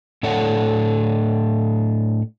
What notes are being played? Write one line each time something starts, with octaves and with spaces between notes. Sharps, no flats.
A2 D4 A4 C#5 F#5